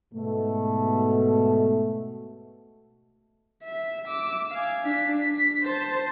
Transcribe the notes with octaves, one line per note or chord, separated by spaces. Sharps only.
G#2 B2 A3
E5
D6 E6
F5 G#5
D4 B6
B6
C5 A5